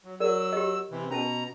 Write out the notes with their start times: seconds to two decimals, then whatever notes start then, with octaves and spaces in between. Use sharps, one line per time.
0.05 F#3
0.20 F#3 A#4 D5 E6
0.53 G4 D#5
0.91 C3 E3
1.11 B2 C#4 B4 A5 A#5